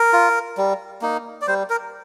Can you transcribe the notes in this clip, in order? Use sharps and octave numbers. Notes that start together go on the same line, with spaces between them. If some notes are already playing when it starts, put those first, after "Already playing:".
Already playing: A#4
F4
G3
A#3 D#4
D5
G3 C5
A#4